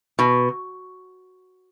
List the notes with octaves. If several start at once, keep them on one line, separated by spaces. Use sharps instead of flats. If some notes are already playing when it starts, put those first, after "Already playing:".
B2